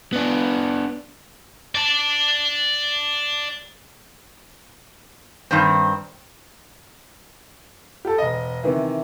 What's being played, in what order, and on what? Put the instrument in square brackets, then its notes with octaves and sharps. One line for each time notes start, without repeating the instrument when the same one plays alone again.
[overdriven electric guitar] B3 D4
[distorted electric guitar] D5 A5
[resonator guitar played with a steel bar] G2 D#3 C4
[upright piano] G4 A4
E1 D#5
C3 D#3 E3